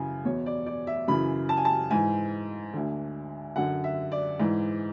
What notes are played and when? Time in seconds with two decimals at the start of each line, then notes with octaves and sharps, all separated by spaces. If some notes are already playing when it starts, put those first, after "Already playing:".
Already playing: F#2 C#3 E3 G#5
0.25 E2 B2 C#5
0.46 D5
0.66 D5
0.87 E5
1.08 F#2 C#3 E3 B5
1.49 A5
1.57 G#5
1.65 A5
1.90 G#2 E3 G#5
2.74 D2 D3
3.56 F#2 D3 F#5
3.84 E5
4.12 D5
4.40 G#2 E3